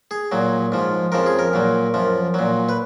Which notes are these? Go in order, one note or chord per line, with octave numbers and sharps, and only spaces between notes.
G#4
A#2 F#3
G#2 F3
F2 C#3 F3 A#4
G#4
A#4
A#2 F#3
F#2 F3
A#2 F#3
B4